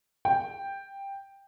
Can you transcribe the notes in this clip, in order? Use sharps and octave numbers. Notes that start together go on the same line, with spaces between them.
G5